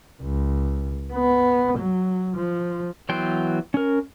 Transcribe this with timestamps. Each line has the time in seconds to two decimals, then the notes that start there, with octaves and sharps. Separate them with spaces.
0.22 C#2
1.14 B3
1.78 F#3
2.36 F3
3.09 E3 F#3 B3 G5 C6
3.74 C#4 A#4